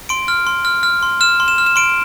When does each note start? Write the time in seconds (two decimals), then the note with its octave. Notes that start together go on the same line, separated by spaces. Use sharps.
0.09 C6 D7
0.28 F6
0.47 C6
0.65 F6
0.83 F6
1.03 C6
1.21 F6 E7
1.40 C6
1.48 E7
1.58 F6
1.66 E7
1.76 C6 D7